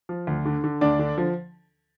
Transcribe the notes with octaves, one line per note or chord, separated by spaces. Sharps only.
F3
D2
D3
D3
D2 D4 D5
D3
F3